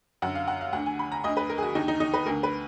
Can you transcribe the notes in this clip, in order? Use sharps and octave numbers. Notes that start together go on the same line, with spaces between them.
F#2 D3 F#5
F5
F#5
F5
D2 D3 F#5
G#5
B5
A#5
D2 D3 D#5
B4
A#4
G#4
F#4
D#2 D3 D#4
D#4
D#4
B4
D2 D3 A#4
B4